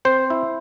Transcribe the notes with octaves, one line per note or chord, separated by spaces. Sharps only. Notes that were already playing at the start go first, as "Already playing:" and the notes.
C4 C5
E4